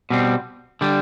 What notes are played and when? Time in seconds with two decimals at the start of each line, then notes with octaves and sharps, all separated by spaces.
0.10 B2 G3 C4
0.81 D3 G3